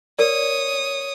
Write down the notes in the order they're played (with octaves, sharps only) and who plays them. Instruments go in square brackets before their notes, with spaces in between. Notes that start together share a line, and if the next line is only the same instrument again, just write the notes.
[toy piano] A#4 D5 [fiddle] C#5 D#6